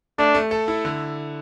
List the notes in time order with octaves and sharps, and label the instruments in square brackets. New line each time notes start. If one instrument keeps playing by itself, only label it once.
[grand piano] A3 [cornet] D4
[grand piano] A3
A4
E4
D3